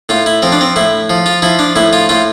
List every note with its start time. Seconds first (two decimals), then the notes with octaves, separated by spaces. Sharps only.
0.09 A2 F4
0.26 E4
0.42 F3 C4
0.52 D4
0.61 C4
0.76 A2 E4
1.10 F3
1.26 F4
1.42 F3 E4
1.59 D4
1.76 A2 E4
1.93 F4
2.09 A2 F4